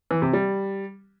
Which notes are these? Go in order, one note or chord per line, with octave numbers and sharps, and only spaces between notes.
E3
C3
G3